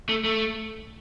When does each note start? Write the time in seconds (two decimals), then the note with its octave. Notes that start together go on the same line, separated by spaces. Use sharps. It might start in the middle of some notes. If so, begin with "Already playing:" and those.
0.09 A3
0.24 A3